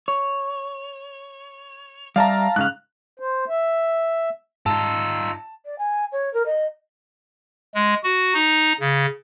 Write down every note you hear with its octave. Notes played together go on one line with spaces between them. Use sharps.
C#5
G3 D5 E5 F5 A5 A#5
G#2 C#3 F5 F#6
C5
E5
G#2 D#4 F4 A5 E6
D5
G#5
C#5
A#4
D#5
G#3
F#4
D#4
C#3